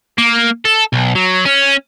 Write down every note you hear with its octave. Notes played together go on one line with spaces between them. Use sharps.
A#3
A4
B1
F#3
C#4